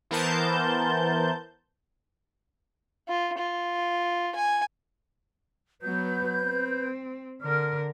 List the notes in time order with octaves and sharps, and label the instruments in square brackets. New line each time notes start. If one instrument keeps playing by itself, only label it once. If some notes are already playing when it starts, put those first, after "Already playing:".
[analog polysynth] E3 B3 A#4 C5 A5 G6
[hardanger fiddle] F4
F4
G#5
[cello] F#3 B3 [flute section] B4 G6
[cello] C4
[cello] D3 A#4 [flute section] F6